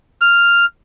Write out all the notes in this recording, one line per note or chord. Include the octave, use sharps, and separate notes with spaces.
F6